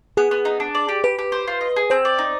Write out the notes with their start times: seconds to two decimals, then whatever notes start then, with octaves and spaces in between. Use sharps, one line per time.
0.17 B3 G#4
0.31 B3
0.45 D#4
0.60 D4
0.75 D5
0.89 G4
1.04 G4 B4
1.19 G4
1.32 C5
1.48 F4
1.61 D#5
1.76 G#4
1.90 C4 C5
2.05 D5
2.19 D#4